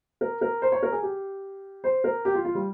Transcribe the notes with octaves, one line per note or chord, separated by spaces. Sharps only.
A#4
A#4
C5
C#5
A#4
G#4
G4
C5
A#4
G4
F4
F4
G3